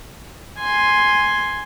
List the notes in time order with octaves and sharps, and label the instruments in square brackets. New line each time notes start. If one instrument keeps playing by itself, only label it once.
[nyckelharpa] G#5 C6